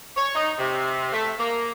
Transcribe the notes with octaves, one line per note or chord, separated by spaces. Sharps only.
C#5
D#4
C3
A3
A#3